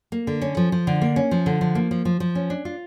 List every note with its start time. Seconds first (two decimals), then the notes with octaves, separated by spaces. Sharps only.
0.12 A#3
0.27 D3
0.42 C#4
0.57 F3
0.72 F3
0.87 D3
1.02 A#3
1.16 C#4
1.31 F3
1.46 D3
1.61 F3
1.75 A#3
1.91 F3
2.05 F3
2.20 F3
2.35 C#4
2.50 D4
2.65 F4